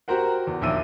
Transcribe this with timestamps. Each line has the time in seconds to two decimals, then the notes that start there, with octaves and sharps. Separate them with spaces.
0.08 F#4 G4 A#4 C5 F#5
0.47 E2
0.61 A#1 D#2 E5 E6 D#7